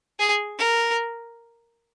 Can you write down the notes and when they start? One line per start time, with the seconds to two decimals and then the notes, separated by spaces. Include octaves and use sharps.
0.20 G#4
0.59 A#4